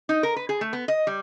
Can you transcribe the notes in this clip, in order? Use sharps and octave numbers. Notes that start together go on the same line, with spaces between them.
D#4
A#4
B4
G#4
A3
B3
D#5
G3